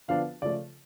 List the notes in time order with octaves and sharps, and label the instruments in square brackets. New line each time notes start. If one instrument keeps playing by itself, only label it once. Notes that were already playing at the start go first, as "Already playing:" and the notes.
[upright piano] D3 F3 B3 D4 F5
C#3 F3 A3 D5